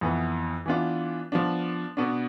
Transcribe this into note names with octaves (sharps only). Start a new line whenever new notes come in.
F2 E3 B3
E3 B3 D4 F4
F3 B3 D4
B2 B3 D4